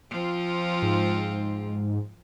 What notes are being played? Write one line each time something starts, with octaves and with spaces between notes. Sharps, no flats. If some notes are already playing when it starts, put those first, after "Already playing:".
F3 C4 F4
G#2